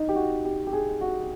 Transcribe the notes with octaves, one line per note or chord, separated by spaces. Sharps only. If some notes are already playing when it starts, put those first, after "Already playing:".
Already playing: D#4
G4
F#4
G4
G4
G#4
F#4